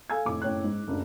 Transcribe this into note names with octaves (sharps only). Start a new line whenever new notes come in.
A4 F5 G#5 E6 G#6
F1 A2 D6
F#1 A2 C#5 G5 F#6
G#2
F#1 D2